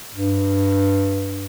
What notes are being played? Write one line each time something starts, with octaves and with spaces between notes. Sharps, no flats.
G2